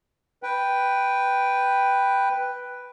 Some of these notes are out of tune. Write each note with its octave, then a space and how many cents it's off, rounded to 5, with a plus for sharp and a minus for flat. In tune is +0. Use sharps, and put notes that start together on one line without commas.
B4 +0 G5 +0